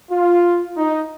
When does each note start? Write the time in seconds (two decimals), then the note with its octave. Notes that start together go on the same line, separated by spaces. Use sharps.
0.11 F4
0.77 D#4